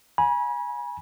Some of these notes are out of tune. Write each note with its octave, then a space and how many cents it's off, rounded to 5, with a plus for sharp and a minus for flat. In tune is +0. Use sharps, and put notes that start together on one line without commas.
G#5 +0 B5 -35